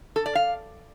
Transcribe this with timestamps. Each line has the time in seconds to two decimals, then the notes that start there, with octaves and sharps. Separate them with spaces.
0.16 A4
0.26 D5
0.35 F5